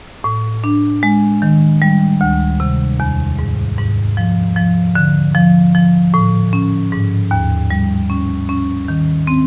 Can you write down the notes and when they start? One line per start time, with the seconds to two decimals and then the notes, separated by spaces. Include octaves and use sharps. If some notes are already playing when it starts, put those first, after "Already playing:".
0.24 A2
0.64 D4
1.03 G#3
1.42 D#3
1.82 G3
2.21 D2
2.60 C3
3.00 E2
3.39 G#2
3.78 G#2
4.17 F3
4.56 F3
4.95 D3
5.35 F3
5.75 F3
6.14 A2
6.53 C#4
6.92 G#2
7.31 D#2
7.71 G3
8.10 C#4
8.49 C#4
8.88 D#3
9.27 C4